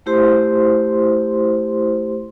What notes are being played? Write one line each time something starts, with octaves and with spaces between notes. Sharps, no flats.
A3 E4 G4 C5 C6